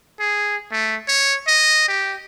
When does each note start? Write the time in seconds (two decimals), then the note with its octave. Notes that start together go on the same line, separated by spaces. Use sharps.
0.19 G#4
0.72 A3
1.08 C#5
1.47 D#5
1.88 G4